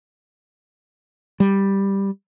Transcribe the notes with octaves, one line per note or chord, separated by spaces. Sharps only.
G3